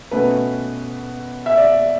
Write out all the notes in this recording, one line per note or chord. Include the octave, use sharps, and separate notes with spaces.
B2 A3 C#4 B4
E5
D5